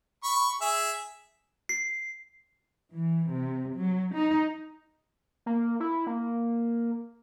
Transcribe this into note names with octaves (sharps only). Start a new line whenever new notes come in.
B5 C#6
G#4 E5
C7
E3
C3
F#3
D#4
A#3
E4
A#3